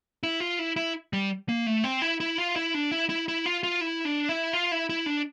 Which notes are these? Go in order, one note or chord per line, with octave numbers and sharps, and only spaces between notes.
E4
F4
E4
E4
G3
A#3
A3
C4
E4
E4
F4
E4
D4
E4
E4
E4
F4
F4
E4
D4
E4
F4
E4
E4
D4